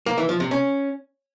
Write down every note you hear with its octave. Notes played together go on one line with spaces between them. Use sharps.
A#3
E3
F3
C3
C#4